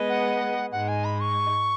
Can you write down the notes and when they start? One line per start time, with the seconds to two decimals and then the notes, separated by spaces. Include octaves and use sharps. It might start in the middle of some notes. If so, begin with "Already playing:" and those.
Already playing: G#3 B3 G#4 B4 D#5
0.09 F#5
0.72 G#2 G#3 D#4 F#5
0.88 G#5
1.05 B5
1.20 C#6